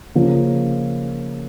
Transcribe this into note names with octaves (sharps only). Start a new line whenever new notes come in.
C#3 F3 A#3